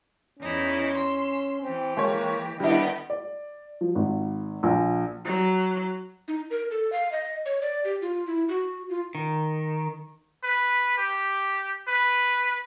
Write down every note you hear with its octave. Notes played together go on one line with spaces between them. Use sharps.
E2 C#4 D#4 E4
C6 E6
E3 C4 G4
G#3 A#3 C#5
D#3 G3 B3 D4 E4 G4
D5
F3
G#1
A#1
F#3
D#4
A#4
A4
F5
D#5
C#5
D5
G4
F4
E4
F#4
F4
D#3
B4
G4
B4